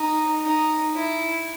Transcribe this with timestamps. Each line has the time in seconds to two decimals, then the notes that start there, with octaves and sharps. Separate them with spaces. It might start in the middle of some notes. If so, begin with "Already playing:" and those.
Already playing: D#4
0.43 D#4
0.95 E4